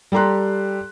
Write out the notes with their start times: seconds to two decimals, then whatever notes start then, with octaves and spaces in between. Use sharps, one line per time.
0.12 G3 G4 A4 A#5 C6 F#6